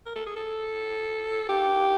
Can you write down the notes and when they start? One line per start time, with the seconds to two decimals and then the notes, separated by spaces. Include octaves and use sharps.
0.06 A#4
0.16 A4
0.26 G#4
0.36 A4
1.49 G4